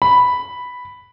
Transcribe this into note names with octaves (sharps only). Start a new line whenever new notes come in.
B5